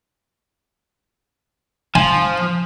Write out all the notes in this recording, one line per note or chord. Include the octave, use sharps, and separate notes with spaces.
F3 G#5